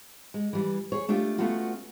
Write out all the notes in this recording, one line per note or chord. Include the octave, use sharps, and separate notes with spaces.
G#3
E3 G3
G#4 C#5
A3 D4 F4 G4
A3 B3 C#4 F4 F#4